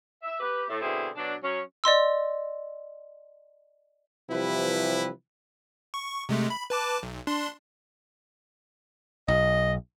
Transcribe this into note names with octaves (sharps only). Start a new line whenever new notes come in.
E5
G4 B4
A2 A3
B2 D3 C4 E4 G#4
B2 F#3 D4
F#3 C#4
D5 D#5 C6 E6
C3 E3 F3 G3 E4 B4
C#6
C3 G#3 A3
B5
B4 A5 D6
B1
D4 C6
B1 D#5